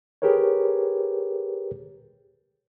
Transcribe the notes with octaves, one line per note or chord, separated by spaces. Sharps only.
G4 G#4 A#4 B4 C#5